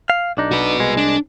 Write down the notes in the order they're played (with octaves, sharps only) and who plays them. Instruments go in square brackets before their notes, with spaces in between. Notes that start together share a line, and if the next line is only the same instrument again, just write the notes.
[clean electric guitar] F5
B1 D4 D#4
[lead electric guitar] F#4 B4
[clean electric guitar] C2 G#3
[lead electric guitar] D4